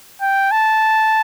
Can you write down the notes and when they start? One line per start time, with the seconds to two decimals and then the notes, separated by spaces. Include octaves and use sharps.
0.22 G5
0.52 A5